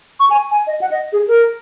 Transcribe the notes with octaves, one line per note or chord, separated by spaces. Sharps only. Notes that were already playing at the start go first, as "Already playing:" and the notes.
C#6
G#5
G#5
D#5
F#5
D#5
G#4
A#4